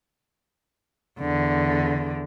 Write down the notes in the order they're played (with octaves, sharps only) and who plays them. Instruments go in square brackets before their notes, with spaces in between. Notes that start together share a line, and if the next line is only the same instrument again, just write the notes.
[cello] E2 D3